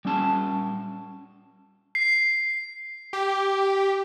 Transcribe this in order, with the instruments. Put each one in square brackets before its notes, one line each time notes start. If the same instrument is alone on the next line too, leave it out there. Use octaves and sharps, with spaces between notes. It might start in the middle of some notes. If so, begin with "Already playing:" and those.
[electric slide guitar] G3 C#4 A5
[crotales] C7
[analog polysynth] G4